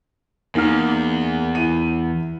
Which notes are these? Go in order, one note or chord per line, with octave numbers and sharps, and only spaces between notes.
E2 A#3 D#4 F6
E4 D#7